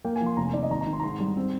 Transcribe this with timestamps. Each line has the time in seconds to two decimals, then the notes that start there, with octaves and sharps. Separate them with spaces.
0.05 A#3 G5
0.16 G#5
0.21 F3
0.26 C6
0.37 F1 A#5
0.46 G#5
0.53 D#3 D5
0.63 D#5
0.70 G#1 A#5
0.81 A#5
0.87 D#3
0.93 C6
1.00 A#5
1.03 G#2 C6
1.20 G3
1.37 C4